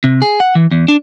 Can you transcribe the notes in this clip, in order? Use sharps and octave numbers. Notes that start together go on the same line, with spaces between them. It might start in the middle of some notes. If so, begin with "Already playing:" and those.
C3
G#4
F#5
E3
E2
D4